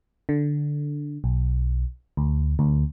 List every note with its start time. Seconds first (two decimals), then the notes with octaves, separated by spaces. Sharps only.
0.29 D3
1.24 B1
2.17 D2
2.59 D2